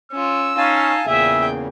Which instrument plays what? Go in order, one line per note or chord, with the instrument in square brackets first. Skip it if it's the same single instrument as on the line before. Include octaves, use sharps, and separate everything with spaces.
[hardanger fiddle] C#4 F4 [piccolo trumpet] E6
[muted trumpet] C#4 [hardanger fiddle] D#4 [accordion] F5 G#5 A5
[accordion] E2 A#2 C#3 [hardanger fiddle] G#4 G5 [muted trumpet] E5